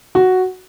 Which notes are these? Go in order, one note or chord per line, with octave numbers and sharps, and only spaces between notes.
F#4